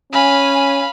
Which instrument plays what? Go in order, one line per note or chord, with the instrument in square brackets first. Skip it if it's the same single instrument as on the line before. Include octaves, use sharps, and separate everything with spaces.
[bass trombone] C#4 [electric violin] F5 B5 [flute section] G#5